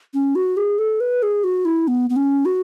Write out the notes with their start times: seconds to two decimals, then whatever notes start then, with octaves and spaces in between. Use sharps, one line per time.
0.14 C#4
0.35 F#4
0.57 G#4
0.78 A4
1.00 B4
1.23 G#4
1.44 F#4
1.65 E4
1.88 B3
2.10 B3
2.16 C#4
2.45 F#4